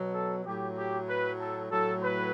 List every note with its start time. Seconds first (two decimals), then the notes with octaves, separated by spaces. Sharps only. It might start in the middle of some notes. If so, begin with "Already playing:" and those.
Already playing: B2 F#3
0.13 A4
0.45 A2 F#3 G4
0.76 G4
1.08 B4
1.40 A4
1.71 A2 F#3 A4
2.03 B4